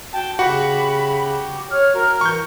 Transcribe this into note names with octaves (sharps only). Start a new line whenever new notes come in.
F#4 G5 A5
C#3 F#4 G4 F#5 B5
C#5 F6
F#4 A#4
E3 C#6 G6